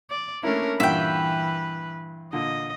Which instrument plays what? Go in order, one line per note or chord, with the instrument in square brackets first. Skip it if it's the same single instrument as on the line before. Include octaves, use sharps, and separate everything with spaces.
[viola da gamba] D5
[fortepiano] A3 A#3 E4 [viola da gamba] C#4 D4 A#4
[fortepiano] G2 A#2 F#5 [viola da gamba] E3 B4 [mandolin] E5 G5
[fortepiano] A#2 D3 [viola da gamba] D#5